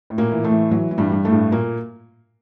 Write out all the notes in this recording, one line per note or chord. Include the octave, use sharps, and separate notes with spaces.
A2
A#2 A#3
E3
A2 A3
E3
E3 F#3
E3
G2 G3
G2
A2 A3
G2
A#2 A#3